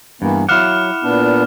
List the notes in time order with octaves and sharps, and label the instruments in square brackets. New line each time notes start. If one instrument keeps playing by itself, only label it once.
[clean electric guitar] G2 [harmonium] E3 A#3 B3
[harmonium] F#3 [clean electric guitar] E4 F5 F#5 [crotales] D6 F6 E7
[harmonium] A#2 B3 D4